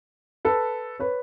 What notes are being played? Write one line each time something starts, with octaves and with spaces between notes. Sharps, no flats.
A4 B4
B4 C#5